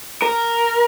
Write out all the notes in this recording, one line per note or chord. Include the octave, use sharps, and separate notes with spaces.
A#4